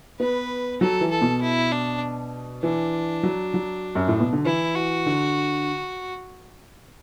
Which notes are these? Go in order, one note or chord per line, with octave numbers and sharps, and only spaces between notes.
B3 B4
F#3 A4
E3
A4
B2
E4
D4
E3 D4
F#3
F#3
F#2
A2
B2
D3
E3 E4
F#4
D3